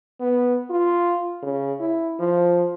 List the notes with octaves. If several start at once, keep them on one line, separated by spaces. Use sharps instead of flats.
B3
F4
C#3
E4
F3